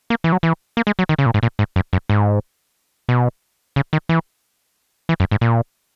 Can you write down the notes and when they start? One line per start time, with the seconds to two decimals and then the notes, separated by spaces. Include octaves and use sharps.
0.10 A#3
0.24 E3
0.32 F#3
0.43 E3
0.77 A#3
0.87 G#3
0.99 F#3
1.09 D#3
1.18 C#3
1.26 A#2
1.34 G#2
1.43 A#2
1.59 G#2
1.76 F#2
1.93 F#2
2.10 G#2
3.09 B2
3.76 C#3
3.93 D#3
4.09 E3
5.09 E3
5.20 F#2
5.31 G#2
5.41 A#2